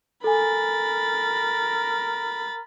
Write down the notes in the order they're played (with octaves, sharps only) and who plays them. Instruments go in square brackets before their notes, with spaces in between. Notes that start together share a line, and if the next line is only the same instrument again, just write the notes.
[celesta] A4 G#5 [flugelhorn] A#4 [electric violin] B5 A6